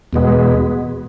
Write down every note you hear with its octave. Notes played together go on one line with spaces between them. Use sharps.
E2 B2 G#3 B3